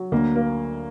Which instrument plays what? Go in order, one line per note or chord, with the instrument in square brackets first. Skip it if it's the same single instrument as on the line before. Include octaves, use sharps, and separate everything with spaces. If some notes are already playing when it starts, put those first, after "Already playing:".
Already playing: [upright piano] F#3
[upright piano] D2 [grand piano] A#3
[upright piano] A#3